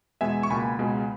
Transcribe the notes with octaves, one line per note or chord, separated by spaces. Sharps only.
E2 B2 G#3 B3 E5 G#5
C#6
C#2 B2 A#3 G#5 B5
C#2 B2 G#3 B3